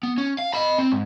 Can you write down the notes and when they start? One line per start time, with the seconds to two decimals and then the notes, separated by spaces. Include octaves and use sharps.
0.03 B3
0.18 C#4
0.38 F5
0.54 D#5 B5
0.78 C4
0.92 G#2